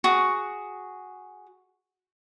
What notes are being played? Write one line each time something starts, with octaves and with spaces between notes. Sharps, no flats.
F#4 G#4